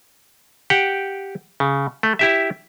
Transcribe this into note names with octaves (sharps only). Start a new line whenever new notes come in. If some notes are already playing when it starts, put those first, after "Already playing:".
G4 F#5 G5
C#3
A3
E4 G4 E5